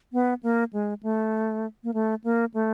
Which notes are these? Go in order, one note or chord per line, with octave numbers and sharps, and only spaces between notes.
B3
A#3
G#3
A3
A#3
A3
A#3
A3